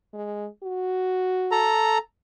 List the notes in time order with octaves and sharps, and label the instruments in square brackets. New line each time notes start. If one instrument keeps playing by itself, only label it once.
[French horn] G#3
F#4
[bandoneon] A4 A#5